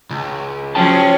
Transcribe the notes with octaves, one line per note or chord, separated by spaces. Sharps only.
C#2
F3 C#4 G#4 C#5 G5 A5